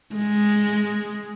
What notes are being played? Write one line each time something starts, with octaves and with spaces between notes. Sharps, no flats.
G#3